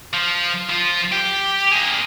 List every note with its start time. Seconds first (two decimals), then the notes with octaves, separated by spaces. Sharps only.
0.13 F3
0.69 F3 F4
1.12 G4
1.72 A#3 G#4